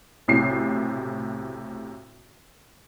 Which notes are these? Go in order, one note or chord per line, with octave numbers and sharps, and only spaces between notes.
B1 A2 C3 C7